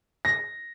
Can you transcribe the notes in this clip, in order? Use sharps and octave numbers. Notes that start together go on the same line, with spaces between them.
A#6